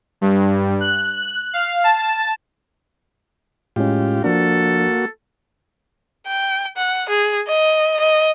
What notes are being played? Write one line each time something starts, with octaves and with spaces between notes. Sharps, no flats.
G2
F#6
F5
A5
A2 G#3 C#4 F4 G4
F3 A#3 D4 F#4 A4
G5
F#5
G#4
D#5
D#5